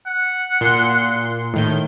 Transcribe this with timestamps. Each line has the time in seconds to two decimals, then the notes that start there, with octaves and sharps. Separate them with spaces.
0.07 F#5
0.61 A#2 C6
1.54 A2 D#3 G6